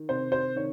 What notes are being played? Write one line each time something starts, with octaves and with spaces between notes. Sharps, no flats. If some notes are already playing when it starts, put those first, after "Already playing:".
Already playing: D#3
C3 C5
C5
D#3 C#5